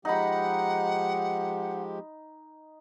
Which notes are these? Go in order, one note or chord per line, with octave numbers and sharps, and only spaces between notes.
F3 G#3 D#4 G4 F#5 B5